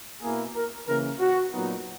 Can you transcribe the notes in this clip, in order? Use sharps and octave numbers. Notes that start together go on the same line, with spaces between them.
B2 A#3 E4 G#4
A#4
C#3 E3 A#3 A#4
F#4
A#2 F#3 B3 D#4